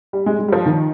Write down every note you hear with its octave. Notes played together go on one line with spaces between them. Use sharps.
G3
G#3
G#3
G3
F3
D#3